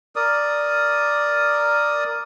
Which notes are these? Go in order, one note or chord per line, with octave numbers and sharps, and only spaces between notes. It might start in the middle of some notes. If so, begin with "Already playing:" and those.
A#4 D5 D#6